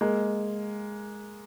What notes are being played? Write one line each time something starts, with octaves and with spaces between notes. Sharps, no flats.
G#3 A#3